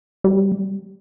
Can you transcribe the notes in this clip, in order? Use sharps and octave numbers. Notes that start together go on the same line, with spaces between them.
G3